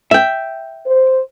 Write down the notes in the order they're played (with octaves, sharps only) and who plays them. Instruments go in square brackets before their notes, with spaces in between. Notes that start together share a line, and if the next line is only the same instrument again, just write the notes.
[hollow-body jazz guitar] E5 G5
[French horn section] C5